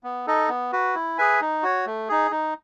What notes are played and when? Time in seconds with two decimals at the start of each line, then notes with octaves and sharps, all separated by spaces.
0.03 B3
0.27 D#4 A4 D#5
0.49 B3
0.72 F#4 B4
0.95 E4
1.18 G#4 B4 E5 G#5
1.41 D#4
1.63 F#4 C#5
1.86 A3
2.09 D#4 G#4
2.31 D#4